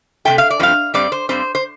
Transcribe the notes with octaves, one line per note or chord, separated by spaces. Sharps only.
C3 F3 A3 G5
F5
D5
G2 F3 A3 C4 F5
G2 G3 C4 D5
C5
G2 G3 C4 C5
C5